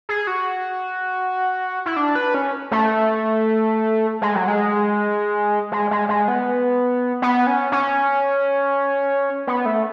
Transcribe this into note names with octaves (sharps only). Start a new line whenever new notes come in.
G#4
F#4
E4
D4
B4
C#4
A3
G#3
F#3
G#3
G#3
G#3
G#3
B3
B3
C#4
C#4
B3
A3